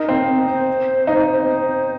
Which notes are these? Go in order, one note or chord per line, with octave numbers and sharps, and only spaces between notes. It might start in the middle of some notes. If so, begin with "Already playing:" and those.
Already playing: D#4 A#4
C4
C5
D#4
C5